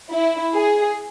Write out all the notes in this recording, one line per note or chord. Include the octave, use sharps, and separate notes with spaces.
E4
G#4